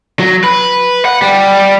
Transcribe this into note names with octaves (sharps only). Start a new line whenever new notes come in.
F#3
B4
F#5
G3